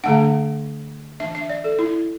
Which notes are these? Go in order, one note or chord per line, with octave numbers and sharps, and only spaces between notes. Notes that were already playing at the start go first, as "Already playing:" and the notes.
D3 A3 D4 F#5
E3 D4 E5
E5
D5
A4
E4